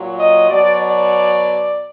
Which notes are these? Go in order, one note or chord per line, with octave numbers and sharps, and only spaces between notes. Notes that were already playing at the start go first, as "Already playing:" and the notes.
Already playing: A#2 F#3
D#5
B2 F#3 D5
D5